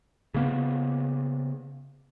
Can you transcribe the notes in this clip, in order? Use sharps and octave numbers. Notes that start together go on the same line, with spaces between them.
C#3 A#3 B3